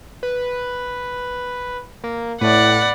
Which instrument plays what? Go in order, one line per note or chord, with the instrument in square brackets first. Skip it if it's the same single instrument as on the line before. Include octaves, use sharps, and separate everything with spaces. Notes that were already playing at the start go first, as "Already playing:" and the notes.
[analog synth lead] B4
A#3
[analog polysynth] A2 [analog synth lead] B4 [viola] D5 F#5